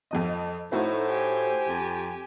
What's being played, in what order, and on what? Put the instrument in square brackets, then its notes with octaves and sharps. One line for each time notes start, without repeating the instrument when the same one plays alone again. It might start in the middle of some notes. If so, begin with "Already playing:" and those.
[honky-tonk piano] F2 F3 D#5
[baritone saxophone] A2 [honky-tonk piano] A3 E4 F#4 [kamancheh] D#4 [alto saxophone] C5
[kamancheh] G4 G#5
[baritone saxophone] F2